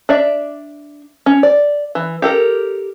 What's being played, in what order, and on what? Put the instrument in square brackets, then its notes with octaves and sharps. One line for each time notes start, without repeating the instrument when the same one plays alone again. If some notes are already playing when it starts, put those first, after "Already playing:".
[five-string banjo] D4 D5 E5
C#4
D5
E3
G4 A4 A#4